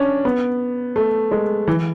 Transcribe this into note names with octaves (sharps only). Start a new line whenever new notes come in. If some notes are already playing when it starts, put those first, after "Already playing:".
Already playing: C#4 D4
B3
A3
G#3
E3